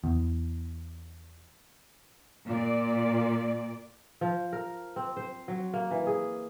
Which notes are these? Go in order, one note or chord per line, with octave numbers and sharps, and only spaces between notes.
E2
A#2 D5
F3
A#4
C4
C5
F#3
A#3
E3
G#4